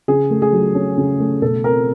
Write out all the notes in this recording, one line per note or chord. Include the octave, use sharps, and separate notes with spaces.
C#3 G#4
A3
G#4
F#3
C#4
C#3
A3
B2 A4
C4 A#4